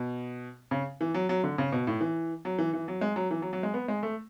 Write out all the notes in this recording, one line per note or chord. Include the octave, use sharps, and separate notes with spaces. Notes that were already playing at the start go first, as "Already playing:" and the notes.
Already playing: B2
C#3
E3
F#3
F#3
D3
C#3
B2
A2
E3
F#3
E3
E3
F#3
G#3
F#3
E3
F#3
F#3
G#3
B3
G#3
A3